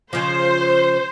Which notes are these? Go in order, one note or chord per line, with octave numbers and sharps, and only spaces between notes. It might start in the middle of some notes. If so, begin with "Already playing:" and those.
C#3 F3 C5